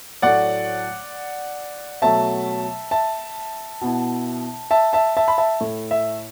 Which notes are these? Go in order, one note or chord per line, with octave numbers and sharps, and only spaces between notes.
A2 F#3 A3 D5 F#5
B2 F#3 A3 E5 A5
E5 A5
B2 B3 E4
E5 A5
E5 A5
E5 A5
B5
E5 A5
A2 A3 E4
E5